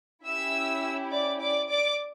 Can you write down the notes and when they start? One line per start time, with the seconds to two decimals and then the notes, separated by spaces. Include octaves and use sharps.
0.25 C#4 E4 G4 E5 E6
1.11 D5 D6
1.40 D5 D6
1.70 D5 D6